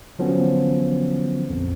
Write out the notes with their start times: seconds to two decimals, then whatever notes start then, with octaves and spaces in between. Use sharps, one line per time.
0.19 D3 F3 F#3 B3 C#4
1.50 A#1 F2